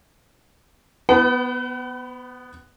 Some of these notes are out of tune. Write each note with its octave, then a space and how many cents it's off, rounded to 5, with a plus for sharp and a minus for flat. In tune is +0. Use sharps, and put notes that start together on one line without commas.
B3 +0 B4 +45 F#5 +40